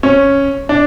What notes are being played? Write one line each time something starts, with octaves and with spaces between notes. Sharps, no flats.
C#4
D4